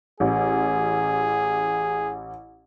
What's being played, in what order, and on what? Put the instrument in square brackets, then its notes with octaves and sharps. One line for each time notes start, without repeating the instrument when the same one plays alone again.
[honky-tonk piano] A1 [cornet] G#4